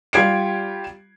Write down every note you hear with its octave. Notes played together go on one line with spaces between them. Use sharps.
G3 F4 G4 G#6 C7 D7